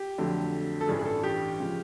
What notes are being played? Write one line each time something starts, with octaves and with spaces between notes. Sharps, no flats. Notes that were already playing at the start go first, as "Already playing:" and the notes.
Already playing: G4
F2 D3 F#3 A3
A4
A1 G2 E3 G#4
G#4
A4
G4
C#3 F3 G#3